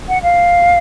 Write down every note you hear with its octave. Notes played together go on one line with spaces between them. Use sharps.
F#5
F5